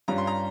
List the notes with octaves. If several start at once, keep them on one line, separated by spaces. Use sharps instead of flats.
G2 G3 C#4 F4 A#5
C6
A#5